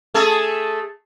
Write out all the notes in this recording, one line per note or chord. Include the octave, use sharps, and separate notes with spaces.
A3 G#4 A4